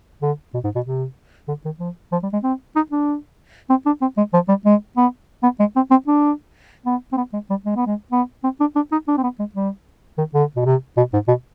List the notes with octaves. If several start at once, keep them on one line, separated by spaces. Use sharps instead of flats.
D3
B2
G#2
B2
C3
D3
D#3
F3
F3
G3
G#3
C4
D#4
D4
C4
D4
C4
G#3
F3
G3
G#3
B3
B3
G#3
C4
C4
D4
B3
C4
B3
G#3
G3
G#3
B3
G#3
B3
C4
D4
D4
D#4
D4
C4
B3
G#3
G3
D#3
D3
B2
C3
B2
G#2
B2